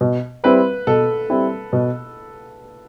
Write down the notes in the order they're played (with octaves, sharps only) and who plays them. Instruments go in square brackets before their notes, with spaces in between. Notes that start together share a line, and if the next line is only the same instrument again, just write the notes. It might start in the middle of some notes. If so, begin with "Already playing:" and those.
[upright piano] B2
[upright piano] G3 C4 E4 [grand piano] B4
[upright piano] B2 [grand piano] A4
[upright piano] G3 C4 E4
B2